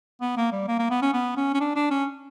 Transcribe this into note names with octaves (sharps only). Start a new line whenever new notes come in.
B3
A#3
G3
A#3
A#3
B3
C#4
B3
C#4
C#4
D4
D4
C#4